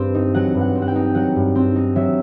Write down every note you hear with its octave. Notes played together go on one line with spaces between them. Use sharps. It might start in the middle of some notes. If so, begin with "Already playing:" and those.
Already playing: G2 C4 C5
D#4
F#3 F#5
G2
F#5
C4
F#5
G5
D#4
F#3 F#5
G2
C4
D#4
F#3 E5